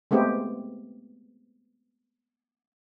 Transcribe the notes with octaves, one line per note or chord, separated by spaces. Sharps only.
G#3 A3 B3 C4 G4